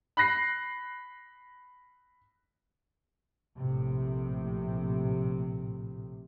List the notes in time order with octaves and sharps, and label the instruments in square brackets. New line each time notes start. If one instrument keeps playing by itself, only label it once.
[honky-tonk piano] B5 F#6 A#6 C7
[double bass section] A#1 A2 C3